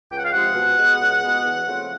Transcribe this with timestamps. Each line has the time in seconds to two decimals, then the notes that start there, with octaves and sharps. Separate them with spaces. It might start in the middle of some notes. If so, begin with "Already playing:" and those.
0.10 C#2 G5
0.18 F#5
0.25 F5
0.32 C3 F3 G#3 F#5
0.54 B2
0.76 G#3 B3
0.99 C#2
1.21 B2 G#3 B3
1.43 E2
1.65 C#3 F3 A3 C4